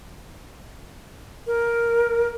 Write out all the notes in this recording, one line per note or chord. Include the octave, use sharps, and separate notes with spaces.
A#4